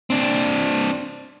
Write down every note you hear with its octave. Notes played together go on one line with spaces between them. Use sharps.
C4 D4